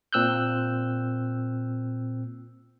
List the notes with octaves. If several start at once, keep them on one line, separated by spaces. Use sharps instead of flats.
A#2 C4 E6 F#6 G6